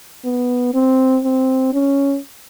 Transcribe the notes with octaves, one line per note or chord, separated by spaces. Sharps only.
B3
C4
C4
C#4